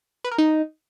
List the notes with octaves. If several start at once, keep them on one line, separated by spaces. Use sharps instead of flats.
B4
A#4
D#4